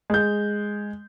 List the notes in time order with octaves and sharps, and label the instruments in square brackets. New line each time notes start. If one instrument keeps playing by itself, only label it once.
[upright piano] G#3 G6